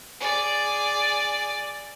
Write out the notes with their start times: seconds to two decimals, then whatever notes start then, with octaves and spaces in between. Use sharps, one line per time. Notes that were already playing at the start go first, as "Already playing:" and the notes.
0.20 G#4 D5